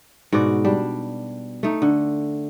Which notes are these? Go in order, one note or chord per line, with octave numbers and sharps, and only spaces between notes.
G#2 B2 F#4 D5
G3 D4
A3 D#4
D3